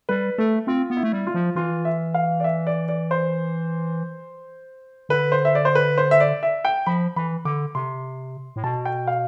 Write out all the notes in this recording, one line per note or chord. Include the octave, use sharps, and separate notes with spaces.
G3 B4
A3 A4
C4 F4
B3
E4
A3
G3
F4
F3
E3 F4
E5
F5
D5
E5
D5
D5
C5
D3 B4
C5
E5
D5
C5
B4
C5
E5
D5
E5
G5
F3 B5
E3 B5
D3 D6
C3 C6
A2
B2 A5
G5
F5